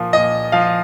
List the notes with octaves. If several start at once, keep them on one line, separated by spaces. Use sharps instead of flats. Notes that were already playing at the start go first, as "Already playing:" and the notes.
Already playing: A#2 F3
A#2 D#5
F3 F5